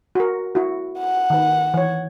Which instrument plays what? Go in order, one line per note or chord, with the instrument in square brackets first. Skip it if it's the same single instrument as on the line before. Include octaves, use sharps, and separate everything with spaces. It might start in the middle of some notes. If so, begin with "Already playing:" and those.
[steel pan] F#4 A#4
E4 F#4
[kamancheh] F#5
[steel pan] D#3 B4
E3 C#5